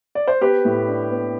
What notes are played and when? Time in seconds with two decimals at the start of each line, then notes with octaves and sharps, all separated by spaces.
0.15 D5
0.28 C5
0.41 B3 G4 B4
0.65 A2
0.87 D4
1.10 B3